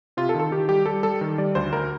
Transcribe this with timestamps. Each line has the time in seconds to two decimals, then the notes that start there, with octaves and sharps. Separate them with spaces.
0.17 C3 F4
0.29 A4
0.34 D#3
0.40 A4
0.52 D#3 G4
0.69 G3 G4
0.86 G3 A4
1.03 G3 A4
1.21 D#3
1.38 G3 D5
1.55 D2 C5
1.73 D2 A#4